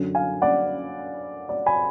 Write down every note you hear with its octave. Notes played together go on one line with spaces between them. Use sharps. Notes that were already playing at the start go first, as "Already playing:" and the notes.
Already playing: F#2 D3 F#3 C#4
F5 G#5
D5 F#5
D5
G#5 B5